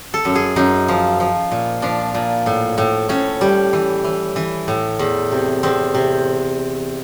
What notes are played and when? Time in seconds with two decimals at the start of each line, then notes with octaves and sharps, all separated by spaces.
0.14 A4
0.25 F#2
0.35 G#4
0.56 F#2 D#4
0.88 F3
1.20 F3
1.51 A#2
1.82 F3 D4
2.15 A#2
2.46 A2
2.78 A2
3.09 A2 C#4
3.41 G3
3.73 E3
4.04 E3
4.36 E3
4.68 A2
4.99 E2
5.32 C3
5.63 E2 C4
5.94 C3